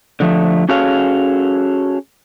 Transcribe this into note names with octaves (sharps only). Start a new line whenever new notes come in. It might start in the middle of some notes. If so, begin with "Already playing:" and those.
D3 F3 A3
C#4 F#4 G#4 A4 C#5 F5